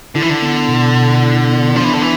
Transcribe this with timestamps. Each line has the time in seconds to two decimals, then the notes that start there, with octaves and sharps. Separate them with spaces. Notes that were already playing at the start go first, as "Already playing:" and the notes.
0.15 D3 E4
0.22 E3
0.30 D3
0.42 B3
0.69 B2
0.95 B2
1.23 E4
1.49 B3
1.76 F3 D4
1.84 E3
1.94 D3
2.02 E3